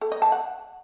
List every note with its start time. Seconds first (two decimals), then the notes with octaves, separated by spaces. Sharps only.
0.01 A4
0.12 D#5
0.22 A5
0.32 F#5